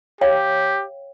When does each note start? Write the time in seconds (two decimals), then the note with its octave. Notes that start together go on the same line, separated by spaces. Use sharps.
0.21 G4 C#5 F5 G5